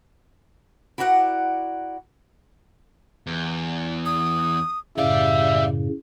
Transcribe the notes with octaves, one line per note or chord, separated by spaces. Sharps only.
E4 F#4 A#4 D5 F#5
E2
D#6
F#2 A2 C#3 G3 D5 E5 F5